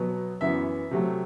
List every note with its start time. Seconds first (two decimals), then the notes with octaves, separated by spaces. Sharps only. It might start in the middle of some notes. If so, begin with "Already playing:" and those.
Already playing: B2 F#3 B3
0.41 F#2 E3 B3 E5
0.91 C3 F#3 A3